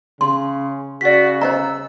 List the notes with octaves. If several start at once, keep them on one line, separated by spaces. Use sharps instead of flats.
C#3 C6
C#3 F#4 D5 B6
C5 D#5 A#5 E6